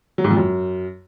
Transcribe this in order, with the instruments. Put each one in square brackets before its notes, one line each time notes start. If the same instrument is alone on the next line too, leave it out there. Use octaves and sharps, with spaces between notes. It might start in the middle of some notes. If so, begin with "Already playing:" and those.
[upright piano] F#3
G#2
F2
F#2